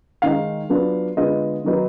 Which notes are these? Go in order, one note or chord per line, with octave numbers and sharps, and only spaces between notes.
D#3 G#3 D#4 F5
F#3 B3 D4 F4
D3 G#3 B3 F4 D#5
D#3 F#3 B3 D#4